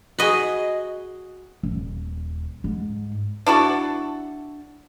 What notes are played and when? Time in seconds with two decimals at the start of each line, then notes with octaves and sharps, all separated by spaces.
0.19 F#4 G#4 D#5 B5
1.63 D#1
2.64 G#2
3.46 D4 E4 F#4 A4